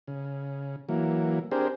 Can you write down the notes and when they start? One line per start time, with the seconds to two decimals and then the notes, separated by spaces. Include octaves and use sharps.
0.08 C#3
0.89 E3 F#3 A#3
1.51 C4 D4 G4 G#4 A#4 C5